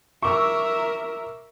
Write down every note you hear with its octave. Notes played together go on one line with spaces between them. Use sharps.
A#4 E5 C#6 D6 E6